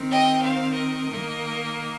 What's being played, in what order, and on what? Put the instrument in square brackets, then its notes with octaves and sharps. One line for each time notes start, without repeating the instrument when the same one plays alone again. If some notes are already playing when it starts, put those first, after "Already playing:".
Already playing: [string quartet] D#3 C4
D#5 G5
C5 F5
A#4 D#5
D#3 A#3